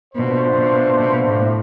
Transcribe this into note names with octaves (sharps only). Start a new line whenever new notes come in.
B2 A3 D4 F4 C5
B2
B2
A2